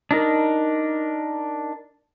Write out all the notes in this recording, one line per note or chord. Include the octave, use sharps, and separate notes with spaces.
D4 D#4 A#4